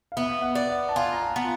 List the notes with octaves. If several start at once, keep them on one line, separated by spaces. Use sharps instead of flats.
F5
B3 E5
F#5
D5
F#5
A5
F4 G#5
A#5
A5
B3